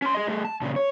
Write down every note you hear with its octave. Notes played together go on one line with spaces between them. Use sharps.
C#4 C6
G#4 D#5
A3 G#4
A5
A#2 C#3
C#5